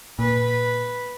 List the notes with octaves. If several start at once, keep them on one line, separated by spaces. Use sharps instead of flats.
A#2 B4